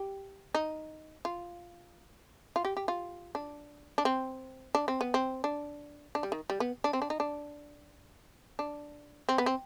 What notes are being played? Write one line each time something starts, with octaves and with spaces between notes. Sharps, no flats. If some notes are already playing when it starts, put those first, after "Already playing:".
Already playing: G4
D#4
F4
F4
G4
G4
F4
D4
D4
C4
D4
C4
B3
C4
D4
D4
G3
D#3
G3
B3
D4
C4
D4
D#4
D4
D4
C4
B3
C4